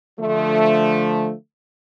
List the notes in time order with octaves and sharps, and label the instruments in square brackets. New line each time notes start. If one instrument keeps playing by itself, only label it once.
[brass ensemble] D3 F3 A3